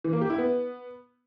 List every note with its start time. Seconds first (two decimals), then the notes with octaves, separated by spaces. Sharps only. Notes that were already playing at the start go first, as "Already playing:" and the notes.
0.04 E3
0.13 A#3
0.21 G4
0.30 E4
0.38 B3